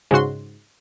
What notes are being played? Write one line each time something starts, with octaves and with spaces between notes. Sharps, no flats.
G#2 C#3 F#4 C6